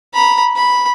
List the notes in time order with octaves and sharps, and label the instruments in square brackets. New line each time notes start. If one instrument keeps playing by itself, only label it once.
[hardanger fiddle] A#5 B5
B5